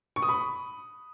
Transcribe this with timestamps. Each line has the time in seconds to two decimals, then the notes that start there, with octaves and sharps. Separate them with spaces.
0.16 C#6
0.22 D#6
0.29 B5